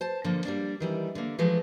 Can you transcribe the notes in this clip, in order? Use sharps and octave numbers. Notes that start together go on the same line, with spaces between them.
C5 A5
D3 F3 A#3
G3 A#3 D4
D#3 E3 G3
D3 A#3
E3 F3 G#3 A3